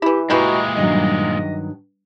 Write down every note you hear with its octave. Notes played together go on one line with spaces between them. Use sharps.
E3 E4 G4
A#2 E3 G#3 E4 F#4 G4 D#5 A#5
G2 D#3 F#3 D#5